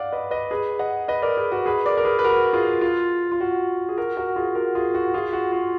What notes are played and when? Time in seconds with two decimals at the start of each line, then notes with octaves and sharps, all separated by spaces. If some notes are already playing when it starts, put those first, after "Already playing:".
Already playing: D5 F5 F#5
0.12 B4 D#5
0.31 B4 D#5
0.51 G#4 B4
0.79 D#5 F#5
1.08 B4 D#5
1.22 A#4 D5
1.37 G#4 B4
1.52 F#4 A#4
1.66 G#4 B4
1.86 A#4 D5
1.97 A#4
2.05 G#4 B4
2.19 B4
2.24 F#4 A#4
2.53 F4 G#4
2.81 F4
3.32 F4
3.41 F#4
3.89 G#4
3.98 F#4 A#4
4.17 F#4 A#4
4.36 F4 G#4
4.55 F#4 A#4
4.75 F4 G#4
4.94 F#4
5.14 F4 G#4
5.33 F#4
5.52 F4